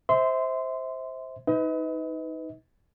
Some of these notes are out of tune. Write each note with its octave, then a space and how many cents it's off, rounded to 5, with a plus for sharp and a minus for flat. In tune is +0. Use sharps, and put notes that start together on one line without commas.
C5 +0 E5 -25 C6 -20
D#4 +20 B4 +20 D#5 +40